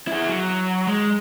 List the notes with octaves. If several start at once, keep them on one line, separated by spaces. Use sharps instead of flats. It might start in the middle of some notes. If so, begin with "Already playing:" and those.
E4 G#4
F#3
G#3